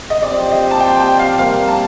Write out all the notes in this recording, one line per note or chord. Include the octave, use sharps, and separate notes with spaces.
D#5
F3 C4 G4 C5 D5
D#5
A5
G5
G5
F5
C3 G3 A#3 F5
A5